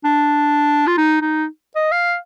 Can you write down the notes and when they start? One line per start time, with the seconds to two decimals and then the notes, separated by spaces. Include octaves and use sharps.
0.05 D4
0.87 F4
0.98 D#4
1.22 D#4
1.76 D#5
1.92 F5